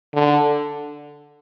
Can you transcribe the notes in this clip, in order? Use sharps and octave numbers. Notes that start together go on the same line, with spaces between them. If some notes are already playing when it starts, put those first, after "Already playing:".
D3